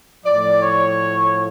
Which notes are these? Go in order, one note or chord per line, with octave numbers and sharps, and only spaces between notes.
A2 F3 D5
C#5